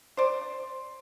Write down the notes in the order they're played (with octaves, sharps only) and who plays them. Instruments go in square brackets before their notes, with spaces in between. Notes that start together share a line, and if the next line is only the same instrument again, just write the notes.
[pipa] C5 D5